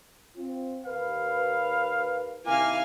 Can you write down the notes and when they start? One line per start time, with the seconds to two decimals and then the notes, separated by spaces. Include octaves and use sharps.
0.36 C4 F4
0.85 D#2 A#4 B4 F5
2.46 C3 D#3 A#3 E4 F5 G#5